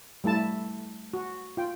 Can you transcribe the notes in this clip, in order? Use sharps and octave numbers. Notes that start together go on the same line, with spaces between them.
G3 A3 E4 A5
F#4
F4 G5